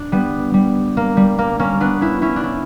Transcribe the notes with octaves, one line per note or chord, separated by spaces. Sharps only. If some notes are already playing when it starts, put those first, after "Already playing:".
Already playing: D4
G3 B3
G3
A#3
G3
A#3
A#3 C#4
B3 D4
C#4 E4
C#4 E4
D4
C#4 E4